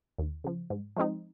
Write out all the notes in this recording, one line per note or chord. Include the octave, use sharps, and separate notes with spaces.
D#2
C#3 F3
G#2
F3 G#3 C4 D#4